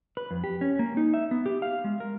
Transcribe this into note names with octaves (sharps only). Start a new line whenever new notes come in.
B4
F2
G4
C#4
A#3
D#4
E5
B3
G4
F5
G#3
A#4